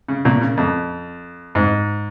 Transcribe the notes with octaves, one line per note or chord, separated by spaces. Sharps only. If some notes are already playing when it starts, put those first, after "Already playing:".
C#3
A#2
C#3
F2
G#2